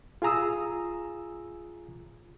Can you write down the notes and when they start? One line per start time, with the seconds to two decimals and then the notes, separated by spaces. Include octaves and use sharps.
0.22 F4 G#4 G#5 A#5 D#6 E6